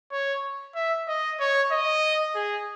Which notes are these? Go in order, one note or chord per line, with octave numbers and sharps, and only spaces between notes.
C#5
E5
D#5
C#5
D#5
G#4